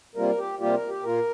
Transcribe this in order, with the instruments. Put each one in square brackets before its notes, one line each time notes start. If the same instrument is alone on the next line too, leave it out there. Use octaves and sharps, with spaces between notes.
[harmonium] C3 G3 A#3 F4 A#4
G4
C3 G3 A#3 F4 G4
A#4
G4
A#2 A#3 F4 A#4